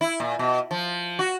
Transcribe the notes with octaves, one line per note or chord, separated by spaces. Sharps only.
E4
A#2
B2
F3
F#4